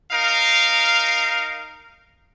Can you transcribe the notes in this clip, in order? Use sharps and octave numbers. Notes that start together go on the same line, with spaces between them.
D#4 A#4 F5